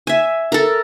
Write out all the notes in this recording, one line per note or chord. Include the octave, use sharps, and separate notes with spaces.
E5 G#5
A4 A#4